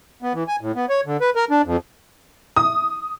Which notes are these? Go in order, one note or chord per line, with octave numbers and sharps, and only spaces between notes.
B3
E3
G#5
A2
B3
C#5
D3
B4
A#4
D4
F2
D#6